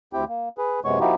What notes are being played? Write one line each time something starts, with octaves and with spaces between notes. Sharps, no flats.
D2 C4 E4 G4 G5
A#3
G#4 B4
F#2 C3 G#3 B3 C#5 C#6
F3 A#3 D#4 E4 F#4 G4